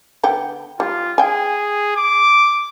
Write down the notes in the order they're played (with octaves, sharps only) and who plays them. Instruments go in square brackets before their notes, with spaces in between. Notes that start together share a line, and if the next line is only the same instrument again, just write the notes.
[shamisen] D3 B3 G5
[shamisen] G3 [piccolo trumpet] F4
[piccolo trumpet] G#4 [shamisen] G5 G#5
[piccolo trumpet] D6